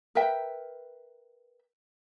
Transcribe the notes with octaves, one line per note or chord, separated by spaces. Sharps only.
A#4 B4 E5 G5